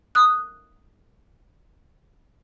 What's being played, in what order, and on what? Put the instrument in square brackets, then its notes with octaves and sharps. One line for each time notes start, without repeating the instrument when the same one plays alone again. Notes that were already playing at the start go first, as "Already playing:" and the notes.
[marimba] D#6 F#6